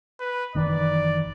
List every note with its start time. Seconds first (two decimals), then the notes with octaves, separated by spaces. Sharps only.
0.19 B4
0.55 F#1 D#3 E3 D5